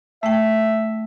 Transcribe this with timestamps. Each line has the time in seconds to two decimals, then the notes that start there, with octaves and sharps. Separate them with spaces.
0.23 A3 E5 G5